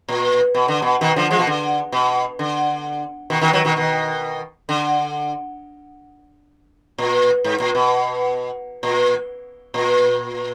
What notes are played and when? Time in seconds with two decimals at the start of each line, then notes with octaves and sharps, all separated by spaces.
0.08 A#2
0.54 B2
0.68 D3
0.82 B2
1.01 B2 D#3
1.16 D3 F3
1.31 F3 G#3
1.39 B2
1.47 D3
1.92 B2
2.39 D3
3.30 B2 D#3
3.41 B2 D#3
3.53 D#3 F#3
3.65 B2 D#3
3.76 B2 D#3
4.69 D3
6.98 A#2
7.44 G#2
7.60 A#2
7.75 B2
8.83 A#2
9.74 A#2